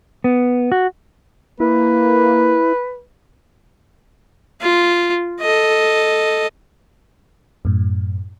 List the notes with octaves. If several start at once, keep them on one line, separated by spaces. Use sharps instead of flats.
B3
F#4
A#3 E4 B4
F4
A4 D#5
F#2 A2